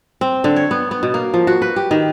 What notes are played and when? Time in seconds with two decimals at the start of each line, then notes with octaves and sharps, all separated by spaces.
0.21 C4
0.44 D3
0.56 C#5
0.71 B3
0.91 B3
1.03 B2
1.14 A#3
1.34 F3
1.47 F#4
1.62 B4
1.76 G4
1.91 D#3